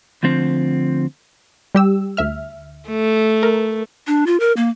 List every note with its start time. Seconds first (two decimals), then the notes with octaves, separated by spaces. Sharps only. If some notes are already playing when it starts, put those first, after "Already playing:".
0.23 D2 D3 F3 C4
1.75 G3 G4 E6
2.17 D2 E5 F6
2.89 A3
3.43 A#4
4.07 D4
4.26 F4
4.40 A#4
4.57 A#3